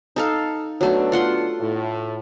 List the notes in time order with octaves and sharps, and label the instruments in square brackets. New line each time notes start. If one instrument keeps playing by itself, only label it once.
[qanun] D#4 A4 F5
[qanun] F#3 A3 [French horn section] B3 D4 F#4
[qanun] F4 F#5 C6
[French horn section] A2